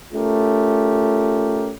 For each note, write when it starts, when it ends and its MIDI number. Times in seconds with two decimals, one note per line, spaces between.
0.13 1.71 57
0.13 1.71 61
0.13 1.71 65
0.13 1.71 67
0.13 1.71 70